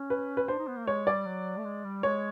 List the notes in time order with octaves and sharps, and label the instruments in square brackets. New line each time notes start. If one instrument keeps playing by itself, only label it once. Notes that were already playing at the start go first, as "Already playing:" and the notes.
Already playing: [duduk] C#4
[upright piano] B4
B4
[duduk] D4 [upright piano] C5
[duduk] D#4
B3
A#3
[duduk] G#3 [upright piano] C#5
[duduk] G3 [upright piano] D5
[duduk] F#3
A3
G#3
G3
[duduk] G#3 [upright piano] C#5